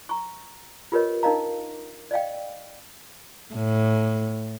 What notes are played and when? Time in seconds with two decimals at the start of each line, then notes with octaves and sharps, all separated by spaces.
0.09 A#5 C#6
0.92 F4 G4 A#4 B4 C#5 D#5
1.23 D4 D#4 A#4 D#5 F5 A#5
2.11 D5 D#5 F5 G5
3.54 A2